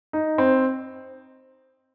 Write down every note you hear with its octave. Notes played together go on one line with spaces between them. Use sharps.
D#4
C4